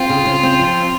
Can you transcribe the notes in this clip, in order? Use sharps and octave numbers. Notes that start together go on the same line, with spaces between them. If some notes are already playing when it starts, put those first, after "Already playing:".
Already playing: C4 F4
C#3
C#3
C4
F3